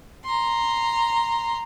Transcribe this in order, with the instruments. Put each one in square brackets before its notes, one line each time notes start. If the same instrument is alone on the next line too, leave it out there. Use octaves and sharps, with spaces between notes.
[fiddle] A#5 C6